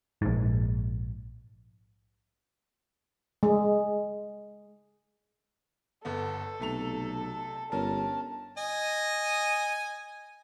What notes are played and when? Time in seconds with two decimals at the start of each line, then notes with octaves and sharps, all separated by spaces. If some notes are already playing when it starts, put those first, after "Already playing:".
0.22 A#1 G#2
3.43 G#3
6.05 G1 B3 A4
6.60 B1 C3 A3 F7
7.72 G1 C#4 A#4 A5
8.58 D#5 G#5